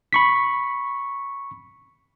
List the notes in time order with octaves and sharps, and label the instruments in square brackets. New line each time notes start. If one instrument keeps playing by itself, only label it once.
[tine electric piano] B5 C#6 B6